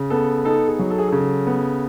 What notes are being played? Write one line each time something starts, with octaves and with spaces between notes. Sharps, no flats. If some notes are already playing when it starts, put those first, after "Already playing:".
Already playing: C#3
B3 A4
D#4 A4
G#4
F#3
A4
G#4
C#3 A4
B3